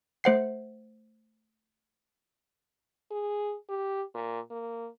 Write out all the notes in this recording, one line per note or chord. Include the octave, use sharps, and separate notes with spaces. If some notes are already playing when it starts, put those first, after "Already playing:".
A3 C5 F#5 C7
G#4
G4
A#2
A#3